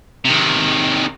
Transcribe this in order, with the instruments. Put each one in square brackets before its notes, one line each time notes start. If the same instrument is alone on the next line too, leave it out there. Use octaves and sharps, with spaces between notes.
[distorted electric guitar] C3 D#3